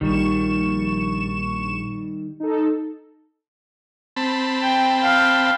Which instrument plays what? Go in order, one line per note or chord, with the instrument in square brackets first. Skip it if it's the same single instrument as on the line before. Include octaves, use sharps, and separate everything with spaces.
[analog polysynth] A#1 C#6 E7 [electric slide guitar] D#3 G3
[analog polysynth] D#4 A4
[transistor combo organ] C4 A5 B5
[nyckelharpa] G5
F5 G5